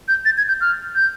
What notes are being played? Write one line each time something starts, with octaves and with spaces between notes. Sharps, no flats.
G6
A6
G#6
G6
F6
G6